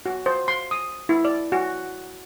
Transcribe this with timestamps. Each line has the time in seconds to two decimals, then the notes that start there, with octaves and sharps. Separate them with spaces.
0.06 F#4
0.26 C5
0.48 C6
0.71 D#6
1.09 E4
1.25 D5
1.52 F#4